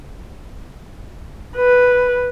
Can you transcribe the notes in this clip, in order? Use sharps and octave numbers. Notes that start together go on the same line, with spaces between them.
B4